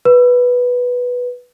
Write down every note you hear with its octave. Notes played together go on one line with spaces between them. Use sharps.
B4